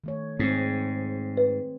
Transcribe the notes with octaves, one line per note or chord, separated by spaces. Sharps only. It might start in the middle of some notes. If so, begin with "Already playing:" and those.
D#3 A3 C#5
G#2 C4 G#4
B4